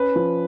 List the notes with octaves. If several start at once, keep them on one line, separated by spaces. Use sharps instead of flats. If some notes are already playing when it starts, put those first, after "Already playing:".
Already playing: C#4 B4
F3